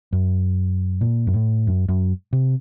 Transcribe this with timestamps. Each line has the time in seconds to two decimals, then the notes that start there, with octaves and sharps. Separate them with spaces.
0.13 F#2
1.01 A#2
1.27 F#2
1.33 A2
1.67 F#2
1.89 F#2
2.33 C3